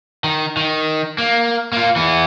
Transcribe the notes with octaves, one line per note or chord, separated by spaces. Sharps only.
D#3
D#3
A#3
A#3 F4
E3 B3